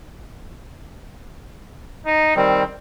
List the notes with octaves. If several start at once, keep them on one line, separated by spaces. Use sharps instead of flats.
D#4
D#3 G3 C4